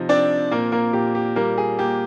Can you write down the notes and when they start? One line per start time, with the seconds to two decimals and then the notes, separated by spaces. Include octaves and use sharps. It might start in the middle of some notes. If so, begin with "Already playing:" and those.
Already playing: C3 F3 D#4
0.09 C4 D4 D5
0.52 A#2 A#3 A#4
0.72 A#3 A#4
0.93 A#2 G4
1.15 G4
1.36 G3 A#3 A#4
1.58 G#4
1.79 A#3 G4